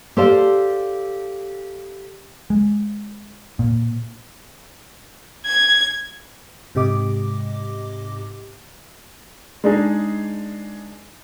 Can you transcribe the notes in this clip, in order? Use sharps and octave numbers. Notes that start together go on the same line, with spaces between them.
G4 A4 C5 D5 F5
G#3
A#2
G#6
G#2 C3 G4 D#5 D6
G#3 D4 D#4 G#4